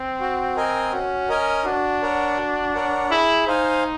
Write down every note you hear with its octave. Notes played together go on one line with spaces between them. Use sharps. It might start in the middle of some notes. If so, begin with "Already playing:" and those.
Already playing: C4
F#4
A#4 D#5 G#5
C#4 F#4
A#4 D#5 G#5
D4 F#4
A#4 C#5 F#5
F#4
A#4 C#5 F#5
E4 G#4
D#4 C5 F5 G#5